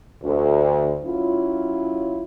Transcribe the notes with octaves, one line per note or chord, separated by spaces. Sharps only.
D2
F#3 C#4 E4 F4